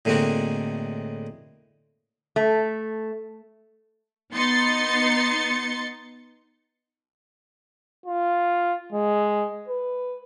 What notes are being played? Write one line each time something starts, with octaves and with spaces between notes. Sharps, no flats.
A2 D3 G#3 A#3 C4 F#4
A3
B3 D#4 C6 A6 C#7
F4
G#3
B4